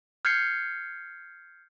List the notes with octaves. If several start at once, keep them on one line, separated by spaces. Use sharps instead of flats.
F6 G6 G#6 C7 C#7